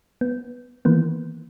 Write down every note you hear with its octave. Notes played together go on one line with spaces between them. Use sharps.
B3
D#3 E3 A#3 B3